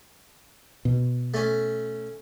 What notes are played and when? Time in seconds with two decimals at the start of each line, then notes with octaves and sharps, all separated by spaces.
0.85 B2
1.34 A3 C#4